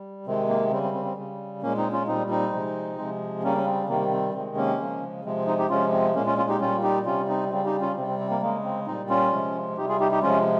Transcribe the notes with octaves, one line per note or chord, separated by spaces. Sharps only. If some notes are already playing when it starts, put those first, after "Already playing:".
Already playing: G3
C3 D#3 G#3 C4
A#3
C#3 G3 C4
C4
C4
C4
C#3 G3
A#2 G#3 A#3 C#4
C4 D#4
C#4 F4
A#2 G3 C4 D#4
C4 D#4
C3 F3 G#3
C3 F3 G#3
C#3 G3 A#3 C#4
C#4
C4
C3 D#3 G3 A#3
C4
C3 D#3 G#3 C4
A#3 C#4
C#3 F3 G#3
C3 F3 G#3 C4
C4
C4 D#4
D#4 G4
C3 F3 G#3 C#4 F4
C4
A#2 G#3 A#3 C#4
C#4 F4
C#4 F4
D#4 G4
A#2 G3 C#4 F4
D#4 G4
C3 G3 C#4 F4
C4 D#4
C#3 G3 C4
D#4 G4
C#4 F4
C3 G3 C4
C4
C4
A#3
C#3 G#3 A#3
C4
A#2 G3 C4 D#4
C#4 F4
C3 F3 G#3
C3 G3 D#4 G4
F4 G#4
D#4 G4
D#4 G4
C3 F3 G#3 C#4 F4